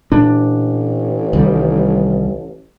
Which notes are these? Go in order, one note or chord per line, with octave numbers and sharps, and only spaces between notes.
A1 A#2 D4
C2 D#3 G3